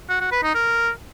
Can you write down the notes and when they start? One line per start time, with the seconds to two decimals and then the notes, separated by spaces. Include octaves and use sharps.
0.09 F#4
0.21 F#4
0.32 B4
0.43 D#4
0.55 A#4